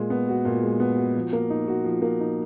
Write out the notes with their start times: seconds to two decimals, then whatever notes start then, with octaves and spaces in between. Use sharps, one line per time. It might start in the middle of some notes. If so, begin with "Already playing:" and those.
Already playing: A#2 G#3
0.10 B3
0.29 F#4
0.45 A#2
0.63 G#3
0.80 B3
0.98 F#4
1.15 F3
1.33 A#3
1.50 D#4
1.68 F#4
1.84 F3
2.02 A#3
2.20 D#4